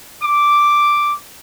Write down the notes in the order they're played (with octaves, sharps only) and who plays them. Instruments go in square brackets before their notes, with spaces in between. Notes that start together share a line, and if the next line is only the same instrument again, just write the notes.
[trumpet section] D6